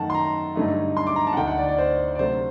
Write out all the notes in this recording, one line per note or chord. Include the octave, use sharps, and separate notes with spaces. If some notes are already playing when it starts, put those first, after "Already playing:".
Already playing: F#2 D#3 A3 D#4 F#5 A5
C6
A#5
G2 D3 F#3 A3 D#4
C6
D6
A#5
A5
F#5
D2 D3 A3 D#4 G5
F#5
D5
D5
C5
D5
C3 F#3 A3 D4 C5